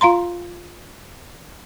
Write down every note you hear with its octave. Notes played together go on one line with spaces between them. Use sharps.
F4 F5 A#5 C6